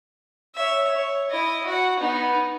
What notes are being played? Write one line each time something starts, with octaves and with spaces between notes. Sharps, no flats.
C#5 E5
C#5
E4 D#5
F#4 F#5
B3 D#4